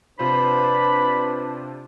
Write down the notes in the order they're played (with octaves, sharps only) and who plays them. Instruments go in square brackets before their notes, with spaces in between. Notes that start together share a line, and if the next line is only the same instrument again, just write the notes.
[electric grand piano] C3 F4 C5 [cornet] D4 [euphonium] B4 [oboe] B5